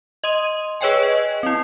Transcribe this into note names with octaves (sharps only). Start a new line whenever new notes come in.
D#5 C6 D#6 D#7
G#4 B4 C#5 D#5 G5 G#5
D#5
C4 E4